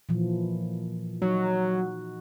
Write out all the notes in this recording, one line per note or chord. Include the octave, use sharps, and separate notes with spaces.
A#2 E3 F3
F#3 D#4 F#4